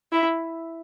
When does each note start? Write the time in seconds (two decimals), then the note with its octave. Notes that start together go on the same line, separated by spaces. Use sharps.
0.12 E4